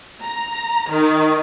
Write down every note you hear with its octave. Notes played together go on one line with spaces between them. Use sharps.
A#5
D#3